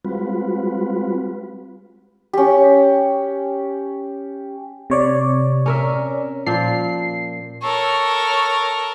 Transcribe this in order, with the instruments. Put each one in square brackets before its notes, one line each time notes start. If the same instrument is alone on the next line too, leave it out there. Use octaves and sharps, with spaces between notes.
[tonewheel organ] G3 G#3 C4 F4 F#4 B4
[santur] C#4 G4
[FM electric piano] C3 C#5 D5
[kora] C#4 A#4 E5
[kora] A#2 F3 [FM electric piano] C7
[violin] A4 A#4 [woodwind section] C#5 C#6